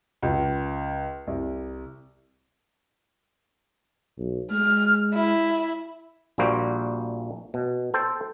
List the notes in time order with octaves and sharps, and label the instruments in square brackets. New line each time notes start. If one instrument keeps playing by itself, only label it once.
[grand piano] C#2
C2
[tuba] B1
[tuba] G#3 [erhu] F6
[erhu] E4
[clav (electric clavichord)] A#1 A#2 G3 A#3 F#4 C5
B2
A4 C5 G5